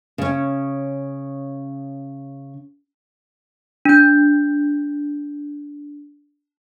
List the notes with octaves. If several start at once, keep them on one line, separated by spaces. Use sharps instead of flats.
C#3 C#4
D4 G6